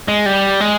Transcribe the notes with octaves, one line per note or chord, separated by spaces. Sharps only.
G#3
G3
G#3